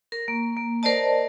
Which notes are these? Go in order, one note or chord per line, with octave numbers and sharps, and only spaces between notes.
A#4
A#3
A#3
A#4 C5 D5 D#5 A5